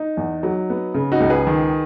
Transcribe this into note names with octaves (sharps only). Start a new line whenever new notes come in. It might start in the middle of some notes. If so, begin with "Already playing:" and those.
Already playing: D#4
E2
F#3
B3
C#3
D#4 F#4
C#2
G#4 B4
D#3